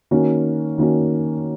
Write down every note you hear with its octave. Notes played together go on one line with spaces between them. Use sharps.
D#3 A#3 C#4 F#4
D#3 A#3 C#4 F#4